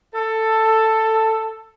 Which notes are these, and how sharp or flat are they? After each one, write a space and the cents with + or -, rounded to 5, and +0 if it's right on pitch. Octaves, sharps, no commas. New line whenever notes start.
A4 +10